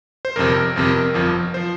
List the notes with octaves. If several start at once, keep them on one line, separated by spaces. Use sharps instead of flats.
C5
G1 F2 C3 A#4
G1 F2 C3
G1 F2 F3
F3 C5